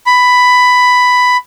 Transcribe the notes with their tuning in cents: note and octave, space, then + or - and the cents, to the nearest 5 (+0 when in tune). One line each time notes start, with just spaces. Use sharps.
B5 +10